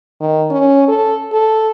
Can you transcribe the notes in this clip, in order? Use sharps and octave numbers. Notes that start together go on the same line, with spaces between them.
D#3
C#4
A4
A4